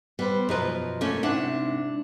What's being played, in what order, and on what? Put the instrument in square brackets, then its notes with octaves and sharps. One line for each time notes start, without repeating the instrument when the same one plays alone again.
[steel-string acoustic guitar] G3 B4 C5 [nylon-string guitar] B3
[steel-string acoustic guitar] F#2 F3 [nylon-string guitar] B2 A#4 B4
[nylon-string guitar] A3 A#3 C#4
[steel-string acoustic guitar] G#2 C3 [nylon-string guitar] D4 E4 F#5